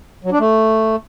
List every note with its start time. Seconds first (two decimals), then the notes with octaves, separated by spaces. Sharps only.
0.24 F#3
0.32 D4
0.40 A3